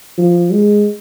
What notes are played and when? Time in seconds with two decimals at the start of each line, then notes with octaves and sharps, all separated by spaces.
0.18 F3
0.52 G#3